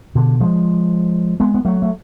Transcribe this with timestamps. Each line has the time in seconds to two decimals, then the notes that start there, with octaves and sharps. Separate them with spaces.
0.15 B2 D3
0.40 F3 G#3
1.40 G#3 B3
1.54 B3
1.65 F#3 A3
1.82 A3